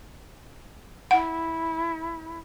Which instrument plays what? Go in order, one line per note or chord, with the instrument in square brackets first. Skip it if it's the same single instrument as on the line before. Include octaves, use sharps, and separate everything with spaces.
[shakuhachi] E4 [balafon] F#5